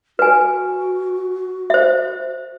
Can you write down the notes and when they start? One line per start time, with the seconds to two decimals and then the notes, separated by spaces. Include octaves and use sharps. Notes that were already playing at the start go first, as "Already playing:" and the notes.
0.19 F#4 B4 G#5
1.70 C5 E5